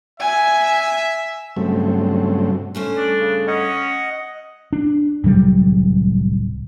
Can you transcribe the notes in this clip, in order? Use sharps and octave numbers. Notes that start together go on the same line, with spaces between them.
E5 G#5
G2 C#3 F#3 A3 C4
G2 A3 C#4 C5
D4
C#3
C#4 D#5 F#5
D4
D1 C2 F#3 G3